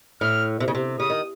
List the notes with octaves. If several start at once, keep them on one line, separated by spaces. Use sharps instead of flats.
A2 F6
C3
C#3
C3
C#3 D#6
D#3